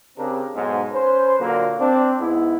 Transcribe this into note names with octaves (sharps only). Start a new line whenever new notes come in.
C#3 C4 D4 G4 A#4
B1 G#2
C#4 B4 C5
A#2 D3 F#3 A#3
C4 D4
G#2 B3 E4